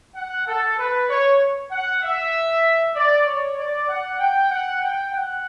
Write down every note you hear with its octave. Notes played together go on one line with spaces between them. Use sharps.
F#5
A4
B4
C#5
F#5
E5
D5
C#5
D5
F#5
G5
F#5
G5
F#5